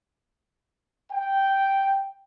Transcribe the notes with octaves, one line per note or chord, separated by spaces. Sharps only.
G5